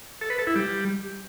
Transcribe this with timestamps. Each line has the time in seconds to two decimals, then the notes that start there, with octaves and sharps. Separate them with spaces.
0.21 A4
0.30 B4
0.39 A4
0.47 E4
0.56 G3